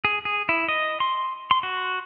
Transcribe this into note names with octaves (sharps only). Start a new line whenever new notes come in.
G#4
G#4
E4
D#5
C6
C6
F#4